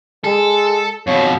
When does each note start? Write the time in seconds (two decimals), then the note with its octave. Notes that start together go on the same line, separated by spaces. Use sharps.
0.24 G#3 A4
1.07 F2 B2 C#5